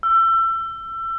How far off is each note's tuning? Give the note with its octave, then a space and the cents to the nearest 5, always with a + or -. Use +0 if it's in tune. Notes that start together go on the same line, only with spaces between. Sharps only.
E6 +30